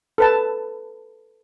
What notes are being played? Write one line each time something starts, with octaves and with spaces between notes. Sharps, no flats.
A4 B4 A5